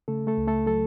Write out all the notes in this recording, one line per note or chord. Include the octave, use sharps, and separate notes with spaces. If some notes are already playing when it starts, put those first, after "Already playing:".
C#3 A3 A4
A3 A4
C#2
A3 A4
F#3 A3 A4